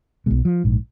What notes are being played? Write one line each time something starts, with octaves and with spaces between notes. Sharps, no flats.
B1 B2 G#3
F3
A#1 G#2